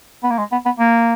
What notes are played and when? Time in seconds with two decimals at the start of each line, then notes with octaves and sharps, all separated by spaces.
0.23 B3
0.30 A#3
0.38 G#3
0.52 B3
0.65 B3
0.79 A#3